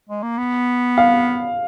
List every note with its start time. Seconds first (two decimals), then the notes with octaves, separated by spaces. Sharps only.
0.09 G#3
0.23 A#3
0.38 B3
0.98 F5